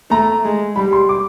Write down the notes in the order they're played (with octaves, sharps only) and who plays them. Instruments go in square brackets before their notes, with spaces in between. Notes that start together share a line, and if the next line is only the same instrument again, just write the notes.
[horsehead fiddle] A3 [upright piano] A#5
[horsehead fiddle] G#3
[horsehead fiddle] G3 [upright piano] B5
[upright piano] C6
D6